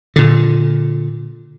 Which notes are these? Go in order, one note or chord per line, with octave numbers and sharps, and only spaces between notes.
A#2 D3